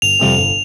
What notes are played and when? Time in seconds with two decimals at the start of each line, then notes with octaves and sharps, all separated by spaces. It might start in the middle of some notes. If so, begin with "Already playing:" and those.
0.02 G1 F7
0.20 F2 C3 G3 C4
0.37 G1